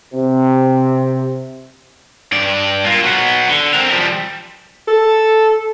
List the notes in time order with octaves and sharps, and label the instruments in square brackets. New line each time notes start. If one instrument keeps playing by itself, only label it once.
[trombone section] C3
[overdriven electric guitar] G2 D5
A#3 F4
F#3 B3
D3
C4 A#4
F3 G3
[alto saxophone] A4